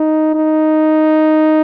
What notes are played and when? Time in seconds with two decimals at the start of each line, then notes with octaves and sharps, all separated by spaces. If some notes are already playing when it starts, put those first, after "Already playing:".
Already playing: D#4
0.35 D#4